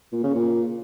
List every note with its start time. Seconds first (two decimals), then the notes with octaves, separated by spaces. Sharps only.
0.12 A#2
0.24 C#3
0.35 A#2